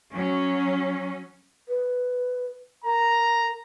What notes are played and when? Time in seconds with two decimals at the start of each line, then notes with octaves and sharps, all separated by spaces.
0.14 F#3 C#4
1.69 B4
2.84 A#4 A#5